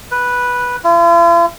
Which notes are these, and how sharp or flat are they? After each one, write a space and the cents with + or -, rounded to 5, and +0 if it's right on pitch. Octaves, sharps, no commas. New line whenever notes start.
B4 -5
F4 -45